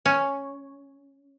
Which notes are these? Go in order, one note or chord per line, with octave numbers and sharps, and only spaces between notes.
C#4